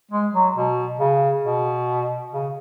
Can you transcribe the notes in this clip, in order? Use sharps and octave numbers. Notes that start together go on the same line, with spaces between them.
G#3
F#3
B2
C#3
B2
C#3